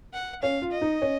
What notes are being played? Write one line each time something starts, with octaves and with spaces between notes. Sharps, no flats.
F#5
C#4 F5
F4
D#5
D#4
C#4